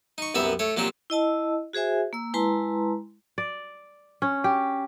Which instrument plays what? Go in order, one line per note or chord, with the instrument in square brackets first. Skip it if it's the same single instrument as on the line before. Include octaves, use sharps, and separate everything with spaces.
[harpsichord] D#4 C#6
C2 F#2 B3 B4 E5 A#5
A3 C#5
A#2 F#3 A#3 C4 G4
[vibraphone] E4 D#5 A5 E6
F#4 G#4 C5 E5 G#5
A#3 E6
G#3 E4 B4 A5 A#5 C6
[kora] D5
C#4
G4